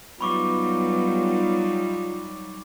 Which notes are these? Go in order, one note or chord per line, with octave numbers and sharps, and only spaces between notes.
F#3 G3 B3 D#4 F4 B5 C#6 D6